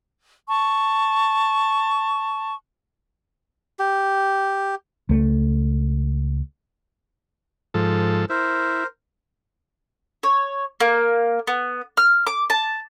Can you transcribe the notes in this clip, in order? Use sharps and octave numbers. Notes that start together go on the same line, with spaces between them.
A5 C#6
G4
C#2 A3
G#2 F3 A4
E4 A#4 C5
C#5
A#3
B3
F6
D6
A5